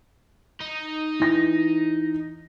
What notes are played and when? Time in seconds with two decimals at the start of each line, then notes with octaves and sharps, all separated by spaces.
0.61 D#4
1.20 E3 A#6